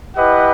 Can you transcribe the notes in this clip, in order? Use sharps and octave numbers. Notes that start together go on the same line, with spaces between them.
E4 G4 B4 D#5 F#5